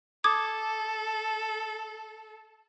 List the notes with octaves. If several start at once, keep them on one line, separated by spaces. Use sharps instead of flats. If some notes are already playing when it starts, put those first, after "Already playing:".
A4 D6 D#6 G#6